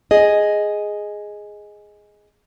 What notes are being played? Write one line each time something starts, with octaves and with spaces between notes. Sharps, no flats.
G#4 D#5